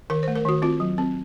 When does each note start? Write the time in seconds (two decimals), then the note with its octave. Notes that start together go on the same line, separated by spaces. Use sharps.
0.10 D#3 A#4
0.23 C5
0.28 A3
0.36 A#4
0.45 D#3 F#4
0.62 C4 F4
0.80 F#3
0.98 C4